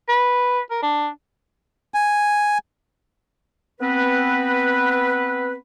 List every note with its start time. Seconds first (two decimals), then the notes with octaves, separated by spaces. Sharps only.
0.08 B4
0.71 A#4
0.82 D4
1.94 G#5
3.81 B3 C4 B4